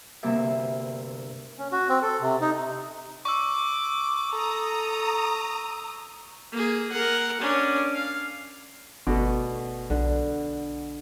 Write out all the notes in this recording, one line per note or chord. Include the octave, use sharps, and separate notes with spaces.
D2 G2 C3 A#3 B3 E5
C#4
F#4
C4
A4
C3
D#4
C3
C#6 D6 E6
A4 A#5 D#6
A#3 G#4
A#4 F#5
C#4 D4
F5
G1 B2 A3 D5
B1 D3